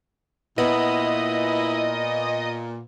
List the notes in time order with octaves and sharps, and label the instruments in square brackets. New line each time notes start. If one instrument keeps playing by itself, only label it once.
[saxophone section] A#2 [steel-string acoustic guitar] B3 [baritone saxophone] E4 [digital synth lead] D#5